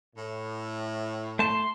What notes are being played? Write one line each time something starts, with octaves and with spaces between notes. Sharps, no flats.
A2
A3 A5 C6